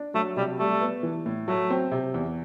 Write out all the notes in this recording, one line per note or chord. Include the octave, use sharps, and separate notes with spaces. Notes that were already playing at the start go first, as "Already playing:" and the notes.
Already playing: D4
F#3 A3
C3 G3
G3 A3
B3
E3
A2
F#3 A3
C4
C3
E2